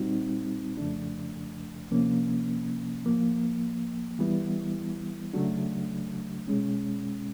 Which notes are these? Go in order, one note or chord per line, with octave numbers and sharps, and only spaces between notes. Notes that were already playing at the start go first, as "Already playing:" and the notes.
Already playing: A#2 G3 C4 D#4 F#4
F2 C#3 F3 A3 D4
C3 F3 A#3 C#4
A2 F3 A#3
E3 G3 B3 E4
C#3 F#3 A3 D4 F#4
B2 G#3 C#4